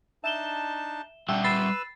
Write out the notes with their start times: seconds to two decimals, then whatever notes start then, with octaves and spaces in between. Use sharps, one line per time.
0.24 D4 D#4 E5 A5 E7 G7
1.29 G3 D4 E5 F#5 G5 E6
1.44 B4 B5 E6 A6 C7